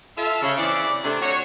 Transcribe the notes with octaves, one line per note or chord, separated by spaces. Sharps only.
F4 A4 E5
C#3
E3 C4 E4 D5
C3 A3 D4
F#4 C#5